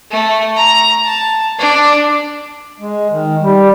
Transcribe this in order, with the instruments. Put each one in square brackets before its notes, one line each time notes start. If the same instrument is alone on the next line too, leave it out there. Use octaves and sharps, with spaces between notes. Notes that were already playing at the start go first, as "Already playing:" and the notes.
[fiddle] A3
A#5
A5
D4
[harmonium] G#3
D#3
G3